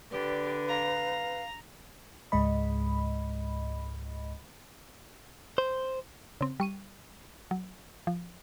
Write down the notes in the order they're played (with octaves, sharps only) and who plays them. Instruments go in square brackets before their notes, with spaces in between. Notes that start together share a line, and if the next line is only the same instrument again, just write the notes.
[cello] D3 [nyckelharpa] G4 [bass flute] B4 [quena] D5
[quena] F5 [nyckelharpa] A#5
[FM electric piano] C#2 G#2 G#3 D#5 B5
[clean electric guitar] C5
[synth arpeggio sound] C#3 C4
G3 C#6 D#7
F#3
F3